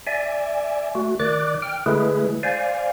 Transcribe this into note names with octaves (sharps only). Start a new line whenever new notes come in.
D5 E5 G#5
A3 F#4
D#3 D5 D6 F#6
G5 F6
D3 G#3 A3 E4 G#4 B4
C5 D5 F5 G#5